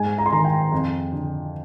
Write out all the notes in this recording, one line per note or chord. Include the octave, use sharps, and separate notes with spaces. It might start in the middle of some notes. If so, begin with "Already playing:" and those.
Already playing: G#2 G#5
A#5
C6
D#3 A#5
G5
F2
D3